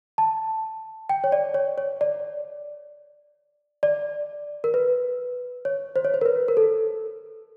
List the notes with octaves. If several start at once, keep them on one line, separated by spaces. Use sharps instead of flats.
A5
G5
C#5
D5
C#5
C#5
D5
D5
A#4
B4
C#5
C5
C#5
C5
A#4
B4
A#4
A4